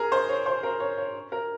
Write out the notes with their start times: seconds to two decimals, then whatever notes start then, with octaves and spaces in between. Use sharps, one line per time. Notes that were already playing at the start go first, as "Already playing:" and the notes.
Already playing: G#4 A#4
0.12 C5
0.29 C#5
0.46 C5
0.63 A#4
0.80 C#5
0.98 C#5
1.32 A#4